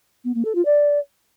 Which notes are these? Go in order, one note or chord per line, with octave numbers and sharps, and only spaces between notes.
B3
A#3
A4
F4
D5